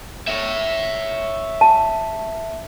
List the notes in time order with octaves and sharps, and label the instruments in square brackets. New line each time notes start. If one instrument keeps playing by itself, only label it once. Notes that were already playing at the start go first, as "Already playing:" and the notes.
[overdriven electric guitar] C#5 E5
[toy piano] A5